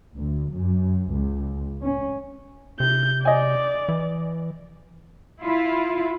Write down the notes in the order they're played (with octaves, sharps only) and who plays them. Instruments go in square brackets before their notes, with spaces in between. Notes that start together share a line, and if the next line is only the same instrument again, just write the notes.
[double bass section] D2
F#2
C#2
C#4
[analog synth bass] C3 [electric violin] G6
[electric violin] D5 [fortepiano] D#5 G#5
[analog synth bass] E3
[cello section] E4 F4